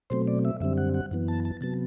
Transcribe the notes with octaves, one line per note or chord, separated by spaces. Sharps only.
B2 F#3 A3 C4 C5
D5
E5
F#2 D3 G3 C4 E5
F#5
F#5
F#2 E3 B3
A5
A5
C3 F#3 B3 A5